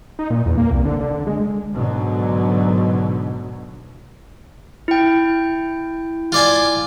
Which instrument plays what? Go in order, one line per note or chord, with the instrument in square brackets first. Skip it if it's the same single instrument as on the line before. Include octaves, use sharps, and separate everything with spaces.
[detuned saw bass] D#4
A#2
E2
A#3
C2
D3
D3
D3
G#3
[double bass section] G#2 B2 D3 F#3
[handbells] E4 G5
[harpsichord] F4 D5 G#5